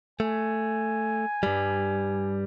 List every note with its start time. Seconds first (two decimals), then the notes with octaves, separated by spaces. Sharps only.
0.20 A3 G#5
1.43 G2 G3